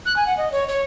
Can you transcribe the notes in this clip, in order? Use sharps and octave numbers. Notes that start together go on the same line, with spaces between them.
F#6
G#5
F#5
D#5
C#5
C#5